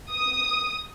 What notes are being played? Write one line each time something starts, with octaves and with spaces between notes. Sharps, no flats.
D#6